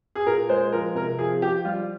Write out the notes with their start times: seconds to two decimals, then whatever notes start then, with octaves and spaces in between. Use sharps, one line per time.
0.15 G#4
0.26 A#2 A#4
0.49 G#3 C5
0.72 F3 A#4
0.95 C3 A#4
1.19 F3 G#4
1.42 F3 G4
1.65 G3 F4